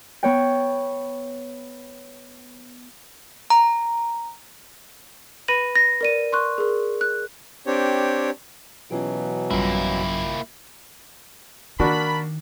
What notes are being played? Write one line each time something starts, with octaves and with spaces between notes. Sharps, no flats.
B3 C#5 G5
A#5
B4 B5 A#6 D#7 F#7
A#6
A#4 D5 D#7
C6 C#6 F#6
G#4 A#4
F#6
C4 D4 G4 C#5
B2 E3 F#3 C#4 F4 G4
A1 F#2 G3 A#3 E4 F4
D#3 A#3 D4 F#4 A#4 A5 B5